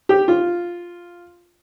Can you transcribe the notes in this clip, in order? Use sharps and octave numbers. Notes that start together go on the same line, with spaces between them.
G4
F4